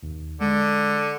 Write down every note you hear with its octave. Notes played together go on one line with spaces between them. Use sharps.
D#2
D3 G#3